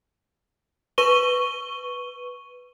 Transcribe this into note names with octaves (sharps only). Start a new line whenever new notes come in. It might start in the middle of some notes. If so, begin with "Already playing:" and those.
B4 C#6 D#7 G7